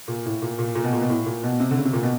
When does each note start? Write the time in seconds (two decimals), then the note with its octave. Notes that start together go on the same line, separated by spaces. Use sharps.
0.08 A#2
0.26 A2
0.42 A#2
0.59 A#2
0.75 A#2
0.84 B2
0.93 A#2
1.01 B2
1.10 A2
1.26 A#2
1.44 B2
1.60 C3
1.71 D3
1.77 C#3
1.85 C3
1.93 A#2
2.03 B2